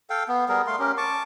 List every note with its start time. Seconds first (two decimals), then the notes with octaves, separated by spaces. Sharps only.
0.10 A4 F5 G5
0.28 B3
0.49 G3 B3 G#4 A#4
0.67 A3 F5 C6
0.79 C#4 G4 A#4
0.97 A5 C#6 D6